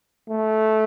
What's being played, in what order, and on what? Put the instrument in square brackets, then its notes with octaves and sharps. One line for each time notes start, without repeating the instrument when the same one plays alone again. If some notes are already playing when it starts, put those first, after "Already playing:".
[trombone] A3